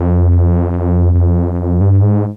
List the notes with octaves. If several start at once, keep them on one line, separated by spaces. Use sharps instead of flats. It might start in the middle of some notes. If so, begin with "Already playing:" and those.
Already playing: F2
F2
G2
G#2